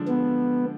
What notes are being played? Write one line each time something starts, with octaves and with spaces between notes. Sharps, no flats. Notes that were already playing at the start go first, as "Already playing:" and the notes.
Already playing: D3 F3 G#3 D4 A4
B3